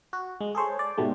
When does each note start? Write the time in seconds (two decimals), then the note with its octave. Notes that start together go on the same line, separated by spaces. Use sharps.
0.13 F#4
0.41 G#3
0.55 G#4 A4 C5 C#5
0.79 D5
0.98 G#2 B2 G3 A3